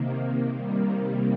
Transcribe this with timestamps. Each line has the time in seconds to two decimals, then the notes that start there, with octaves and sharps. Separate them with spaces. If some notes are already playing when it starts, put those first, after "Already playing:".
Already playing: C3 D#3 A#3
0.52 C3 D#3 G3 A#3